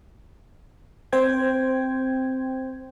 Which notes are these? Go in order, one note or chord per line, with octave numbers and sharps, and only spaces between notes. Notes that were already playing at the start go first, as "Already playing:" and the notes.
C4 C5 G5 G#6